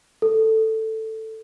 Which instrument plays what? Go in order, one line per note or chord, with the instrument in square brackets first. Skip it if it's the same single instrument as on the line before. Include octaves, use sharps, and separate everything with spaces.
[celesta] A4